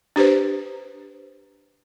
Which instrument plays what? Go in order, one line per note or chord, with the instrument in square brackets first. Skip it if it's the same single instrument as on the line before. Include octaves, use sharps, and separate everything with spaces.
[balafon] D4 G4 B4 C5